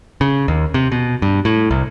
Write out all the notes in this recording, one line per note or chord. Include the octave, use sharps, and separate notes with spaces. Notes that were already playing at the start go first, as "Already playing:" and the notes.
C#3
D#2
C3
B2
G2
A2
C2